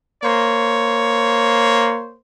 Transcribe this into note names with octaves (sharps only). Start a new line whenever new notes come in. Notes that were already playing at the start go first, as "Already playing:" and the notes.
A#3 C5 C#5